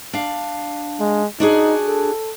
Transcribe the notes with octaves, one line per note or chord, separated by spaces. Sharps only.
D4 F5
G#3
D4 D#4 F#4 G#4
A4